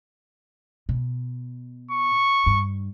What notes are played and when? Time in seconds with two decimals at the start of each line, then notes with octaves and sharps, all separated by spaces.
0.89 B2
1.91 C#6
2.46 G2